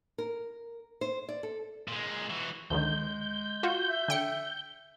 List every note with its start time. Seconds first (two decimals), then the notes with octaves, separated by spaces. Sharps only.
0.18 A#4
1.01 C5
1.29 D5
1.43 A4
1.88 A#2 G#3
2.30 E3 F#4
2.70 D2 D3 D#3 G#3 G6
3.63 F4 F#4
3.89 E5
4.08 D3 G5 C#7